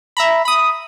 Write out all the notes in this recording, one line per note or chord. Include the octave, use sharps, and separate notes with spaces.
E5 A#5 B5
B5 D#6